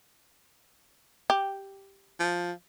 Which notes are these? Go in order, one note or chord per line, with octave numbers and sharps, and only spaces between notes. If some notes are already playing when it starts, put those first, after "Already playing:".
G4
F3